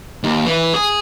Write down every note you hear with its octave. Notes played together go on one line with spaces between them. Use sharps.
D#2
E3
G#4